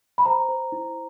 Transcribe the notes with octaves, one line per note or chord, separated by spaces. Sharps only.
B5
C5 A#5
C5
E4